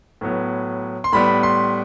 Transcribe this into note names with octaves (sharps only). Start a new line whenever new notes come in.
A2 F#3 B3
C6
A2 G3 B3 B5
C6